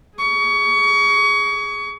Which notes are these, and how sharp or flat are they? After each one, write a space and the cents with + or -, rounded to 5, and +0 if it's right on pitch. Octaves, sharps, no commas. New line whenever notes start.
G#4 +0 C#6 +25